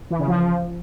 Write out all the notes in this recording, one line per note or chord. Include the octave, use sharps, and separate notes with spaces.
E3
C#3
F3